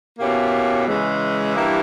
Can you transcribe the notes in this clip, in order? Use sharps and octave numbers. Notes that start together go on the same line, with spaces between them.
B2 A#3 C#4 E4 G4
C#3 E3 G#3
G2 E3 A#3 E4 G4